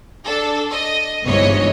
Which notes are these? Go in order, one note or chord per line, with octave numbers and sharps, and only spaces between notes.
D4 A4
D#5
G1 C2 G#2 E3 C#5 D#5